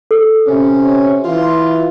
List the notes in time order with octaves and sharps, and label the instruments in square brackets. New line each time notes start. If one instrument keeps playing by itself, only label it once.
[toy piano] A4
[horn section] C3 C#4
E3 F4